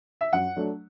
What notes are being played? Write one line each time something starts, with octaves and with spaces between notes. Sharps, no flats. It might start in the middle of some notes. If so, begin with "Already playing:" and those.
E5
F#2 F#5
F#3 A3 D4